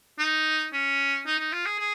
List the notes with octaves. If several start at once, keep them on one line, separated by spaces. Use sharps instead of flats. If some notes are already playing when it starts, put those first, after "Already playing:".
D#4
C#4
D#4
D#4
F4
G#4
G#4